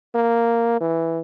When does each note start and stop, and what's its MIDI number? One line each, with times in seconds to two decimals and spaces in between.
0.15 0.79 58
0.81 1.20 52